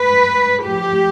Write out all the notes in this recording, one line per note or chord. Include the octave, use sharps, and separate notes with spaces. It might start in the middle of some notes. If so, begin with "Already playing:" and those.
Already playing: B4
A2 F3 G4